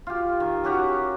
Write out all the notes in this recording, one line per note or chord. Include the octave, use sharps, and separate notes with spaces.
F4 G4
D#3
C#4 F#4 G4 A#5